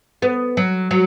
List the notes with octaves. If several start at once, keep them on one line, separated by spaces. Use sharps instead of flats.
B3
F#3
F#3